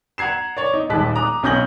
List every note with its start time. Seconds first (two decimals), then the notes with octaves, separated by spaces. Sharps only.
0.18 F#5 A#5 G#6 C7 E7
0.57 C#5 D5
0.74 D#4
0.90 D#1 D#2 G#3 A5 F#6 B6
1.16 A#5 D6 D#6 F#6
1.43 B1 C#4 D#6 G6 A#6 F#7